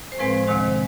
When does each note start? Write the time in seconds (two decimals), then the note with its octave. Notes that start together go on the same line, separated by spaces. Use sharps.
0.12 C5
0.19 A2 F3 G#3 C4 B4
0.33 C5
0.47 D2 C3 D#3 G#3